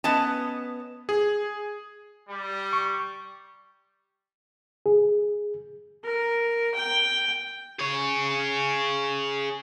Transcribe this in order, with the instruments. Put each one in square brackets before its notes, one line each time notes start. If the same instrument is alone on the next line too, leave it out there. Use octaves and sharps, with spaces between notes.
[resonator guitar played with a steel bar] B3 C#4 D#5 A5
[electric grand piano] G#4
[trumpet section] G3
[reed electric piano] C#6
G#4
[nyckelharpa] A#4
G5
[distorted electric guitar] G#4 C#5